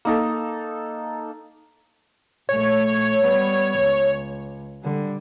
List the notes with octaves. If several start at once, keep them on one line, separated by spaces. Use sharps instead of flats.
A#3 D#4 A4
A#1 A3 C#5
G3 B3
C#2
D3 G3